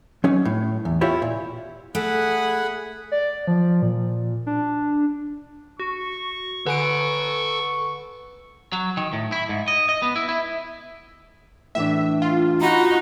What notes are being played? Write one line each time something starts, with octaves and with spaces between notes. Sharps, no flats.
F#3 C#4 D#4
A2
E2
E4 F4 G4 C#5
A#2
A3 G#4 F#5 B5
D5
F3
A#2
D4
F#4 C#6
D3 A4 B4 G#5 D7
F#3
D#3
A2
E4
G#2
D#5
D#5
B3
E4
E4
A2 E3 D4 E5
F4
D#4 F#4 A#5 B5